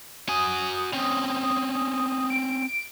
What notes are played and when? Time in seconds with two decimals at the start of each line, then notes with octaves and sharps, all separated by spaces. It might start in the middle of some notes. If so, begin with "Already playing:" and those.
0.29 F#4 G#5 D#6
0.93 C4 C#4
2.30 D7